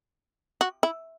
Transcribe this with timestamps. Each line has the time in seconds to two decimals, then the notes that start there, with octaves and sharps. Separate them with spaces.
0.61 F#4
0.83 E4